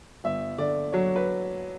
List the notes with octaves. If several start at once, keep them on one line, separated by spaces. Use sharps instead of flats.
G1 E5
D3 D5
F#3 C#5
B4